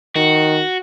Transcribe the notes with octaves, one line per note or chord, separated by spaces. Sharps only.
D#3 F#4